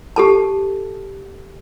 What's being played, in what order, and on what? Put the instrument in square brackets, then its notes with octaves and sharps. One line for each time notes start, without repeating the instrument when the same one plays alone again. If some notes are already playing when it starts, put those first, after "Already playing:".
[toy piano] G4 A4 A5